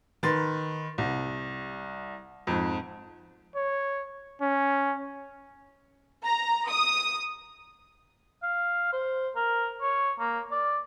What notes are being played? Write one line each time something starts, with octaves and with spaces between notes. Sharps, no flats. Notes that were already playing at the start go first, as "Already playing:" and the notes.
D#3 B4 C6 A6
C2
F2 G#2
C#5
C#4
A#5
D#6
F5
C5
A#4
C#5
A#3
D5